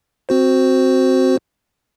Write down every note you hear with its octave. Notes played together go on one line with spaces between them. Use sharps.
C4 F#4 C5